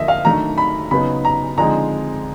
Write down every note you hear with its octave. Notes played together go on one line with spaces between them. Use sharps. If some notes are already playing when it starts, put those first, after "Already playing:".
Already playing: D3 F3 A#3 D#4 D#5 E5
F5
D#3 F#3 A3 D4 A#5
B5
C#3 F#3 B3 D#4 B5
A#5
D3 F3 G#3 C4 D#4 A#5